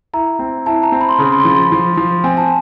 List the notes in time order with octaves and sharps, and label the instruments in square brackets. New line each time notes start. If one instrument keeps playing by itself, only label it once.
[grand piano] E4 [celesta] A#5
[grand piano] C4
[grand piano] E4 [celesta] A5
[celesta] A#5
[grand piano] C4
[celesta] B5
C6
[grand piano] C#3 [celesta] B5
[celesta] C6
B5
C6
[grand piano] F3 [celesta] B5
[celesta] C6
B5
[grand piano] F3
F3
[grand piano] C4 [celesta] G#5
[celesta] A5